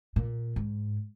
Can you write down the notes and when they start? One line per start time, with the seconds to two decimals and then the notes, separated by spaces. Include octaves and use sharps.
0.16 A#2
0.56 G#2